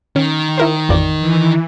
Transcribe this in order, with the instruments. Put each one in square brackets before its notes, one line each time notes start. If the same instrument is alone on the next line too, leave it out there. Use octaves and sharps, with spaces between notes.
[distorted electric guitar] D#3 [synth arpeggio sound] C#4
[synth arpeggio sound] E4 A#4 C5
A1 F2 D5
[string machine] E3